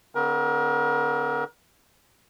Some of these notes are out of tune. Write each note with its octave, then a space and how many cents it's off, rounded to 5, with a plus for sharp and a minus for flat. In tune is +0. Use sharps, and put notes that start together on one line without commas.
D3 -25 B3 +45 A#4 +30